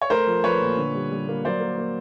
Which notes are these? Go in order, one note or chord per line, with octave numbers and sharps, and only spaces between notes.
C#5
A3 A#4 C5
F3
F3 B4 C#5
A#2
D3
G3
G3
A#3
F#3 C5 D5
A#3
A#3